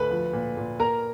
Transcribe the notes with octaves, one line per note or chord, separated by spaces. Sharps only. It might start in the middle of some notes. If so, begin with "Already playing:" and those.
Already playing: D2 A3 B4 B5
F3
A#2
A#2
A#3 A#4 A#5